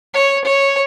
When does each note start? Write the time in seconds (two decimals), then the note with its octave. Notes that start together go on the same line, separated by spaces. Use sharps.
0.14 C#5
0.44 C#5